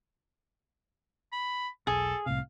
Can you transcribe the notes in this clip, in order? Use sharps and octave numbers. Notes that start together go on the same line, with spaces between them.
B5
E1 B1 G#4 A4
C2 A2 C3 F5